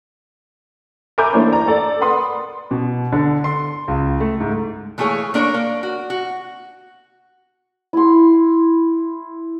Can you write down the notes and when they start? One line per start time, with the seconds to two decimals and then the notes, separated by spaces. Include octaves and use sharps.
1.18 A#4 E5 G#5 B5 D6 G6
1.33 E3 A3 A#3 D4 C5 C#5
1.52 D5 A#5
1.67 A4 D5
2.01 A#4 B4 F#5 B5 C6 D#6
2.71 B2
3.12 D3
3.44 C6
3.88 C#2
4.20 A3
4.40 G#2
4.98 E3 A3 A#3 G#4 C#5
5.34 A#3 D4 A#4 C5 C#5
5.54 A#3
5.83 F#4
6.10 F#4
7.93 E4 C6